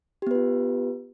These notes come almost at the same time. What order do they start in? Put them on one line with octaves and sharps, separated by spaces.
G4 B3 B4 F4